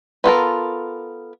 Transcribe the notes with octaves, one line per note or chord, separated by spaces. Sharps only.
B3 F4 A4 A#4